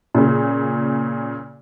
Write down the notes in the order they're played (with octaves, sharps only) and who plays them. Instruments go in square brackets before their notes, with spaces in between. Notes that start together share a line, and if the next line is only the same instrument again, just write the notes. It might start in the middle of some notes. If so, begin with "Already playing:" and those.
[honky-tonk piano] A#2 C#3